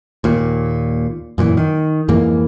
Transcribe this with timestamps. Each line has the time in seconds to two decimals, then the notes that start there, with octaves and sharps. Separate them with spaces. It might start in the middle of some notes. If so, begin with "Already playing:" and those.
0.24 D#2 A#2
1.38 F#2 A#2 D#3 E3
1.57 D#3
2.08 F2 G#2 E3 A#3